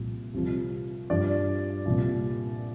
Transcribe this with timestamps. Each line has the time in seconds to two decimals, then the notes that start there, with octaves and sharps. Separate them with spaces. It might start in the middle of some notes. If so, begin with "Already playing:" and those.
Already playing: C2 A#2 F3
0.34 C2 C3 F3
1.10 G2 F3 D5
1.85 C2 A#2 F3